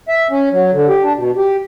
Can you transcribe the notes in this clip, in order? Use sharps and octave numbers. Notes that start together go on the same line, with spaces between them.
E5
C#4
F#3
D3
G4
D4
B2
G4